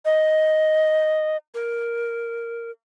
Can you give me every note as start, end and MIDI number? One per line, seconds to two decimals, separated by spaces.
0.05 1.37 75
1.54 2.71 70